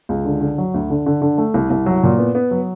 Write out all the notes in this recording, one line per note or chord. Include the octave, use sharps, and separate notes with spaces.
C#2
D3
D3
F#3
D2
D3
D3
D3
A3
C2
C2
F#3
A#2
B3
B3
F#3